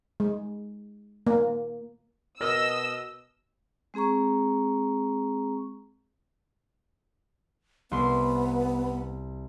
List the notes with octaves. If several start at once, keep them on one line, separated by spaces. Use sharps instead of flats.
G#3
A#3
B2 A#4 D#5 E6 F6 A#6
G#3 C4 G#4 A#5 C#6
C2 B3 C6 C7